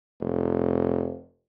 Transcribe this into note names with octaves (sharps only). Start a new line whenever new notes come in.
F1